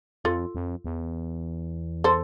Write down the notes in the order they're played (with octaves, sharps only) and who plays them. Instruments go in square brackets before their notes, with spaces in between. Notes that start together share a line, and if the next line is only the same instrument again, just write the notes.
[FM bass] F2 [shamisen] F4 A4
[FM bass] F2
E2
[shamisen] A4 C5